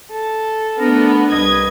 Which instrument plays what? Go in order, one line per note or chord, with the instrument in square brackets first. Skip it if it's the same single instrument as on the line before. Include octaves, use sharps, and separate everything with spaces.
[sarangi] A4
[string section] A3 B3 [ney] D4 [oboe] A#4
[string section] C2 G#6 [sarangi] B4 [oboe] D#5